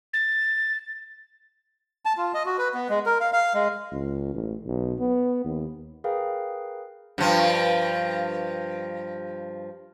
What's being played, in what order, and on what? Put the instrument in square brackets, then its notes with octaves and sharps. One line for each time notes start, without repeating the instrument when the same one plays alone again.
[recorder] A6
[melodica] A5
F4
D#5
F#4
B4
B3
G#3
A#4
F5
F5
G#3
[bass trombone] C#2
A1
B1
B3
D#2
[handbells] G#4 A#4 B4 F5 G5
[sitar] G2 F3